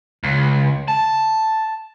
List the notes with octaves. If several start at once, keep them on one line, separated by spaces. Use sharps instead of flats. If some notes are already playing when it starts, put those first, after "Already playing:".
C#2
A5